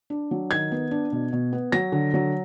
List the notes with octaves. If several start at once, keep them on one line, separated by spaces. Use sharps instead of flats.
D4
F#3
D#3 G#6
B3
D4
B2
B2
B3
F#3 A#6
D3
F#3